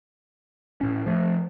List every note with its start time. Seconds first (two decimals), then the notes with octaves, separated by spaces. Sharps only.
0.81 A2 C#4
1.06 F3 A3